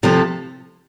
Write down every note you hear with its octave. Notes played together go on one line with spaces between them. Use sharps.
C3 F3 A3 E4 A4